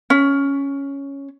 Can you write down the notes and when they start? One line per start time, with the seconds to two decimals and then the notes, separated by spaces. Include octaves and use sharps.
0.10 C#4